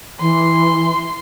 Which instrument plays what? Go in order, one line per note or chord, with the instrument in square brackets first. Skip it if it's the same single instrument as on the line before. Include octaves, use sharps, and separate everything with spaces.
[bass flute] E3 [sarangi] C6